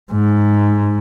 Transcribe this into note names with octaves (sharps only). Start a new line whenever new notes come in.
G#2